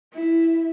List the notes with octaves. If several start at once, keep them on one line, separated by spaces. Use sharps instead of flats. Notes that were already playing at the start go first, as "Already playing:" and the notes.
E4